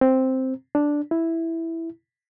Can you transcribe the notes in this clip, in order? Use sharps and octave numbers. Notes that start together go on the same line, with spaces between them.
C4
D4
E4